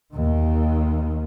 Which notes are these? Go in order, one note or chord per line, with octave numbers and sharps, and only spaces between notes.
D#2 D#3